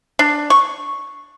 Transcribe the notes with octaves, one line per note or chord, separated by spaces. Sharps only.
D4
C#6